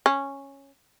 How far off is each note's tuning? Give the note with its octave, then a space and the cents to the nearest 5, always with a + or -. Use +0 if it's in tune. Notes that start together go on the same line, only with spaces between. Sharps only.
C#4 -5